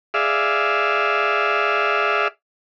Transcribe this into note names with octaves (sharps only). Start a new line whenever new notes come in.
G#4 D5 E5 F5